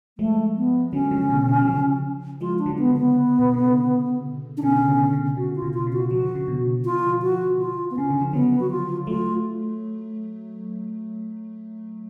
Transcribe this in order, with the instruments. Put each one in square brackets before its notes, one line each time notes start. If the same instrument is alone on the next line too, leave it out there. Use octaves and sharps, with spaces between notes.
[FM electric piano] F3 G#3 [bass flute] A3
[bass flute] B3
[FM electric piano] D3 F#3 [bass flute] C#4
[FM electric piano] C#3 F3
B2 D3
C#3 F3
F#3
C#3 F3
[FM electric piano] F3 G#3 [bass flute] F4
[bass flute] D4
[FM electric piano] D3 F#3
[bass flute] B3
[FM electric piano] C#3
[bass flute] B3
[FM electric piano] B2
D3
C#3
[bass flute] D4
[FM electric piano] B2 D3 [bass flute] C#4
[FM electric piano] C#3
B2 D3
C#3
[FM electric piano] C#3 [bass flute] F#4
[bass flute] F4
[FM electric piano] B2
[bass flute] F4
[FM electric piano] C#3
[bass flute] F#4
[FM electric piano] F3 [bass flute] F#4
[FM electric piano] D3
C#3
B2 D3
[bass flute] F4
F#4
F4
B3
[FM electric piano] C#3 [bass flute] C#4
[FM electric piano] D3
F3
[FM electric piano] D3 F#3 [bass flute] B3
[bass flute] F#4
F4
[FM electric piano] F#3 A3 [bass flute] F4